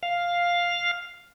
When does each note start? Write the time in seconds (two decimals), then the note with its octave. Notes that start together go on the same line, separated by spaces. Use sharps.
0.03 F5